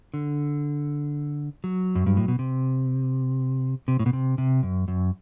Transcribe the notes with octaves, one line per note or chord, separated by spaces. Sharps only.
D3
F#3
F#2
G2
A2
B2
C3
C3
A2
B2
C3
C3
F#2
F#2